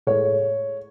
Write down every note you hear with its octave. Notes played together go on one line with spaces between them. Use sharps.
A2 G#3 C#5